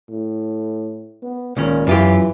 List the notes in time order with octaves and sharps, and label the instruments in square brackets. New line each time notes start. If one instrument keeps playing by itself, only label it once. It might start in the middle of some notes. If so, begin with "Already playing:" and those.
[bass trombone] A2
B3
[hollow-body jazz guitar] C#2 D#3 C#4 [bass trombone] A#2
[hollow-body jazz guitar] F#2 F4 G4 [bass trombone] E3